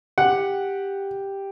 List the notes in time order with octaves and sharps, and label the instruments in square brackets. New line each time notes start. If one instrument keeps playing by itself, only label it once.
[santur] G4 [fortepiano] F#5